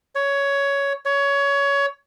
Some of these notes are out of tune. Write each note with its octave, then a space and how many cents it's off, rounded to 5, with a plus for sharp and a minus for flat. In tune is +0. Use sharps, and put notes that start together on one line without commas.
C#5 +10
C#5 +20